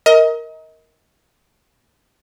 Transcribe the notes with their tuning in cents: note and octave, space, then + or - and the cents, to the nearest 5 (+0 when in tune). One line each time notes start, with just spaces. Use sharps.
A#4 +0 D#5 +30